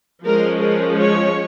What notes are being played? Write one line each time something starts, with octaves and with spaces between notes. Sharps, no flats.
F3 G#3 C#4 A#4
A#4
C#5